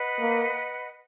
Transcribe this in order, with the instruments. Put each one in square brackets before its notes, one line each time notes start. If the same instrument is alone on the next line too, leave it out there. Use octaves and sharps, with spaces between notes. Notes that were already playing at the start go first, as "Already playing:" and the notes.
Already playing: [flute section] B4 D#5 F#5
[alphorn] A#3